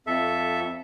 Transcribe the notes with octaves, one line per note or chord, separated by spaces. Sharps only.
F2 A4 E5